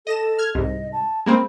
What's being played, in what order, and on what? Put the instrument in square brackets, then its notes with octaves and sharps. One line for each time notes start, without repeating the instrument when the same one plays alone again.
[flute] A4 [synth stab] D#5 A#6 E7
[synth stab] F6 G#6
[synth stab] C2 G#2 [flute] D#5
[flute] A5
[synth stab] G#3 A#3 C4 [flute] B5